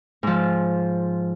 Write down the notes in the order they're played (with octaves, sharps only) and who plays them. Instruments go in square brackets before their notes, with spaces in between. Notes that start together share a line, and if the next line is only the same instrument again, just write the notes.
[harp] G#2 F3